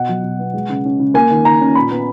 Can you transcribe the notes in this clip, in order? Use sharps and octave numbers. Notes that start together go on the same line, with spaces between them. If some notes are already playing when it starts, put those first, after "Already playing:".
Already playing: B2 F#5
F#3
B2
B3
G#3
C#3
C#4
C#3
A#3 G#5
D#3
D#3 A#5
C#4
A#2 B5
B3